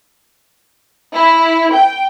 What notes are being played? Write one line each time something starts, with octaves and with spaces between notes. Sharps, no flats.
E4
G5